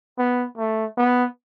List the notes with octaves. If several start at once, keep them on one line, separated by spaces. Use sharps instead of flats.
B3
A3
B3